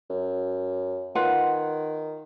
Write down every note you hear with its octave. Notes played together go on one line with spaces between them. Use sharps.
F#2
D#3 F4 B4 F#5